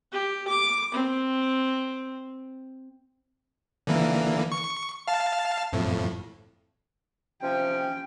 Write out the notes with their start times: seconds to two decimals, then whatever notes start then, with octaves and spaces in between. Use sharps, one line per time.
0.12 G4
0.48 D6
0.94 C4
3.87 D3 E3 A#3
4.52 C#6
5.08 F5 A5
5.73 F2 A2
7.42 C3 F3 C#4 G5